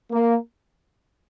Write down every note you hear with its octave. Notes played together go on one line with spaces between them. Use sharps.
A#3